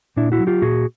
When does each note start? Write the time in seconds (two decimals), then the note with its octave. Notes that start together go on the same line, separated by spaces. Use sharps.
0.17 A#2 D4 E4
0.32 E4 F#4
0.39 F#3
0.47 F4 G4
0.62 A#2 F#4 G#4